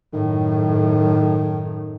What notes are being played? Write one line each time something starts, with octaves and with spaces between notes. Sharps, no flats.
F#2 A2 D#3